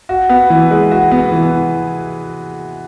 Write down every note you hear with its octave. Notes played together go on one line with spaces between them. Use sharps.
F#4
B3
E3
G#3
F#4
B3
E3